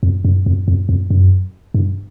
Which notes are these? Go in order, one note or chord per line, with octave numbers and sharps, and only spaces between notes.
F2
F#2
F2
F2
F2
F#2
G2